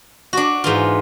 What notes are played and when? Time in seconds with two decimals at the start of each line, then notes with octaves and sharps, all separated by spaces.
0.33 D4 F#4
0.64 G#2 E3 F4